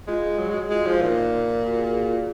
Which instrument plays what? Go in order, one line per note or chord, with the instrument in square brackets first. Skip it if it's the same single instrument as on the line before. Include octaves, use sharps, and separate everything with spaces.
[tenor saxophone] G#3 [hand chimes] F4
[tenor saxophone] F#3
G#3
[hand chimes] F#4
[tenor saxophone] G#3 [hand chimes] F4
[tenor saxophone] F3 [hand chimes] D#4
[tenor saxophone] A#2 [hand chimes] F4
[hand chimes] F#4
G#4
F4